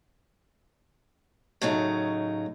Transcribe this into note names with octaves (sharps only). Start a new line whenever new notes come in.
A2 C#3 F#3 D#4